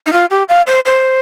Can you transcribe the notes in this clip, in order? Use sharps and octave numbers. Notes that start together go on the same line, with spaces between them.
D#4
F4
G4
F5
C5
C5